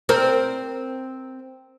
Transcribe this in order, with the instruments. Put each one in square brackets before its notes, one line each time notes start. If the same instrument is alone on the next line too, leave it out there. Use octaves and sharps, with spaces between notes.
[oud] C4 A#4